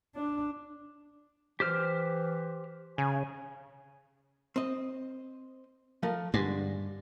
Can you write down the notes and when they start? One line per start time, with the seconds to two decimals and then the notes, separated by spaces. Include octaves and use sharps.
0.15 D4
1.60 E3 G4 C5 F6
2.98 C#3 G#5
4.56 C4 D#5
6.03 F3 A3 A#4
6.34 G2 D3 G#3